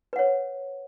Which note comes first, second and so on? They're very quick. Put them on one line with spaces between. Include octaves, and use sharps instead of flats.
B4 F#5 C#5